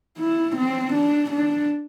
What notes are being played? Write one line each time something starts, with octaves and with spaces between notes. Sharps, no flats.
E4
C4
D4
D4